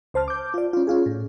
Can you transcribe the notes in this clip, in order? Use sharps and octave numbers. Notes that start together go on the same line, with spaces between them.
C#2 C5 A5 F6
D6 G6
F4 D5
C#4 F4
C#4 F4 G#4
A2